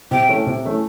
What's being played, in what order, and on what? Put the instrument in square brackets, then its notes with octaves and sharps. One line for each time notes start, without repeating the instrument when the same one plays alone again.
[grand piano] C3 [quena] G5
[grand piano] E3 A3 C#4
C3
E3 A3 C#4